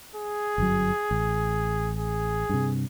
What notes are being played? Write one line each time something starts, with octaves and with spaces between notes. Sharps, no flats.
G#4
G1 F#2 F#3
A1
G#4
G2 C3